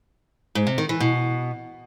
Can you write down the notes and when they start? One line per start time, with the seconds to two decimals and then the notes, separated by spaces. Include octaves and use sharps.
0.55 G#2
0.67 C3
0.78 D#3
0.89 E3
1.00 B2